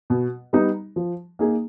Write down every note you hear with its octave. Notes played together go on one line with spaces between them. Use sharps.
B2
G3 B3 D#4
F3
A#3 D#4 G#4